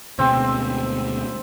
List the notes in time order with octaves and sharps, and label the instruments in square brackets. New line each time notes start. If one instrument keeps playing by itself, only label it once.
[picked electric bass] D2 B2 G#3 [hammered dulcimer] C4